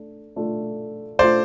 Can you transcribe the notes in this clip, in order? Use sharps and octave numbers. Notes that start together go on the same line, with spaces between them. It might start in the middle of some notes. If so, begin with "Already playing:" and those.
Already playing: A3 D4
A3 D4 F4
A3 D4 F4 C5 D5